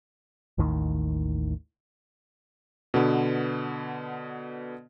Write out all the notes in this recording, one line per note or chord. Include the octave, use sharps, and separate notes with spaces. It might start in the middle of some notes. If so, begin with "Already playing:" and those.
A1 D#2 A2 D#3
B2 D3 B3